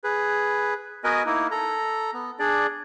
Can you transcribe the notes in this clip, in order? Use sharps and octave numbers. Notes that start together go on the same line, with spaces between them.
G#4 B4
B3 F#4 A#4 B4 D#5 G#5
A#3 D#4 E4
A4 A#5
B3
D4 G#4 D5